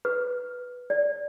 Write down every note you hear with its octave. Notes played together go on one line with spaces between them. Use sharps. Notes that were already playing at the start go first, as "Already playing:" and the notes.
B4
D5